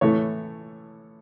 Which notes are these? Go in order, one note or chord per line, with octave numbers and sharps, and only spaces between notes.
A2 E3 A3 C#5